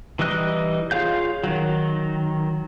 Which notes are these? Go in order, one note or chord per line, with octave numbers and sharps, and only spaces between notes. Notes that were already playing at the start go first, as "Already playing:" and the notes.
E3 G3 D#4 D#5 F#6
F4 G#4 C#5 F5 G6
D#3 F#3